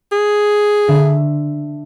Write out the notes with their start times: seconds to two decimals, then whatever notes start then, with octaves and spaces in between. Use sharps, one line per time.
0.12 G#4
0.88 D3 E5